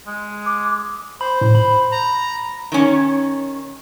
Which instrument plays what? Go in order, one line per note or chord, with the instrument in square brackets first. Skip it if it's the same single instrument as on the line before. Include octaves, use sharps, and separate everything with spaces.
[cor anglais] G#3
[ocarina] D6
[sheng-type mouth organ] C5 [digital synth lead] B5
[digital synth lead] A2
B5
[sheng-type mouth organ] A#5
[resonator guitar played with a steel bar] D#3 C#4